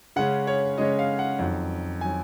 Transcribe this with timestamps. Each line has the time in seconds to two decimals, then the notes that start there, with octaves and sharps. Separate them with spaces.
0.16 C#3 G#3 C#4 F#5
0.47 C#5
0.78 C#3 G#3 C#4 D#5
0.99 F5
1.19 F#5
1.39 F2 D#3 F#3
2.01 D#3 F#3 G#5